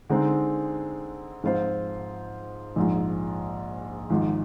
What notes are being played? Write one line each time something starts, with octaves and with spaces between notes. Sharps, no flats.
D3 G#3 C4 D#4
G#2 F3 C4 F4 C5
A#1 G#2 F3
G#1 G#2 F3